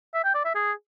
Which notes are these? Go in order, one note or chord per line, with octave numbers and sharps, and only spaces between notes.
E5
G5
D5
E5
G#4